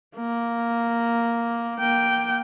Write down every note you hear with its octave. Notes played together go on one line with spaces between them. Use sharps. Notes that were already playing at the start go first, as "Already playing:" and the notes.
A#3
A#3 G5